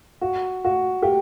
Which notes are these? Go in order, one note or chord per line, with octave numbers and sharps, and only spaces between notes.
F#4
F#4
G4